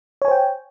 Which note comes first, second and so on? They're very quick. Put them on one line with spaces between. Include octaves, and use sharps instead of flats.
C#5 G#5 C5 G5